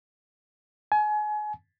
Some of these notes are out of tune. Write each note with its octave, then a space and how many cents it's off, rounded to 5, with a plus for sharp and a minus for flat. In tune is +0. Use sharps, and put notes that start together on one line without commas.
G#5 +30